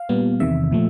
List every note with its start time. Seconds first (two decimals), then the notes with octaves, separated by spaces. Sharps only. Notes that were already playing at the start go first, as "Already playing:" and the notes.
Already playing: F5
0.09 A#2 G3 B3
0.40 E2 C3 D#3 E5
0.71 A#2 F3 A3